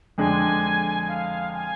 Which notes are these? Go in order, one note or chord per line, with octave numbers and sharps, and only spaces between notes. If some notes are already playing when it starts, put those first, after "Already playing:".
F2 D3 G#3 D4 G#5
F5
G#5